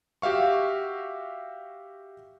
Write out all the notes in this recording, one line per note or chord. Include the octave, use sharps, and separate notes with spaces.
F#4 G4 E5 F5 C#6